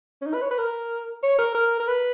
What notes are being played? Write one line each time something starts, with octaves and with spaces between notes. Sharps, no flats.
C#4
D#4
B4
C#5
B4
A#4
C#5
A#4
A#4
A#4
B4